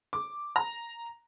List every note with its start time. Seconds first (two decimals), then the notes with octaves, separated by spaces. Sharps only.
0.13 D6
0.56 A#5